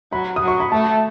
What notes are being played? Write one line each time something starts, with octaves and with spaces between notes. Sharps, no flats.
F#3 B5
D#6
F#3
C#6
B5
A3 A5